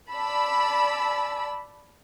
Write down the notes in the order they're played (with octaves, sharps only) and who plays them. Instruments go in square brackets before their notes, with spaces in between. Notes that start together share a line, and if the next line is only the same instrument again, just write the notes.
[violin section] D5 A5 B5 E6